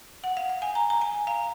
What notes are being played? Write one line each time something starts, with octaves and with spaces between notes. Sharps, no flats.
F#5
F5
F5
G#5
A#5
A#5
G#5
F5